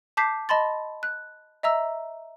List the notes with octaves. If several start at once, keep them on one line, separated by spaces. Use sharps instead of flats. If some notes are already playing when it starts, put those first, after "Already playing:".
A5 D6 G6 B6 C7
D#5 A5 B5 C6 A6
F#6
D#5 E5 A#5 E6